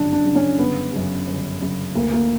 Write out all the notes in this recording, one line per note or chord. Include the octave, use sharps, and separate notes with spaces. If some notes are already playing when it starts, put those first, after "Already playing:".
Already playing: G1 F#2 C#3 D4
D4
F#2 C#3
C#4
G1 B3
F#2 C#3
G1
F#2 C#3
D2 A#3
A#3